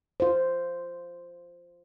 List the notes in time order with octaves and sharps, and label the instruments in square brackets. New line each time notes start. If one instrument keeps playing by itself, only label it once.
[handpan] F4 C5